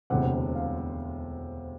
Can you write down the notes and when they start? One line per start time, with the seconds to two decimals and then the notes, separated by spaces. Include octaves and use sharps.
0.10 E1 D2 C3 F#5
0.55 F5